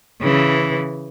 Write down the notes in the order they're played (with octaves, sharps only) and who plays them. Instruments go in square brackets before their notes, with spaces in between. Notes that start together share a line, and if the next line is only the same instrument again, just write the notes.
[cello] C#3 E3